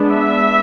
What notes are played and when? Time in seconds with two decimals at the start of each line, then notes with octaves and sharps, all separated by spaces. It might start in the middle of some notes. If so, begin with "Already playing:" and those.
Already playing: G#3 B3 D4
0.11 E5